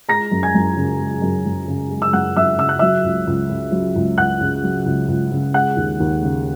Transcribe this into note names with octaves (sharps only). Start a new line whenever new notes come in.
G#3 A#5 A#6
F#2
G#5 G#6
F#2
C#3
G#3
F#2
F#2
C#3
G#3
E6
F#2 F#5 F#6
F#2 E5 E6
C#3 E6
F#6
F#3 E5 E6
C#2
C#2
C#3
F#3
C#2
C#2 F#5 F#6
C#3
F#3
C#2
C#2
C#3
G#3 F#5 F#6
D#2
D#2
C#3